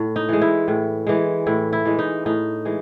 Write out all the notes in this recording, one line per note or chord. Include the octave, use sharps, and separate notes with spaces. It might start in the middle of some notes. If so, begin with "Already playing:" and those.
Already playing: A2
D#4
E3 G#3
E4
A2
E3 G#3
A2 E4
E4
E3 G#3
D#4
A2 D#4
E3 G#3